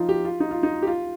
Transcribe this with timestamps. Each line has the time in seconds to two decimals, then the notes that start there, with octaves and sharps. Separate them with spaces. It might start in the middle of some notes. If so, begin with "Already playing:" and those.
Already playing: F3 D#4 F4
0.09 G4
0.25 F4
0.40 D#4
0.51 F4
0.63 D#4
0.82 G4
0.87 F4